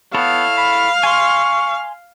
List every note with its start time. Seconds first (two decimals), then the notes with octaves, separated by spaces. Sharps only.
0.14 B3 E4 A4 C#5 F5
0.57 B5
1.03 G#5 C6 C#6